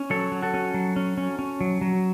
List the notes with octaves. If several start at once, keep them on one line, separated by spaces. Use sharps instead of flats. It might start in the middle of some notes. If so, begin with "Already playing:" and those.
Already playing: C#4
F#3 A4 C#5
F#3
F#4 A4
C#4
F#3
C#4
C#4
C#4
F#3
F#3